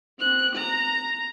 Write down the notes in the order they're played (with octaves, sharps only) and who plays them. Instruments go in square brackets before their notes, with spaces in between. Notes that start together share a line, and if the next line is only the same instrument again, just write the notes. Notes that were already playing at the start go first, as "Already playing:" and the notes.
[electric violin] C4 F#6
A#5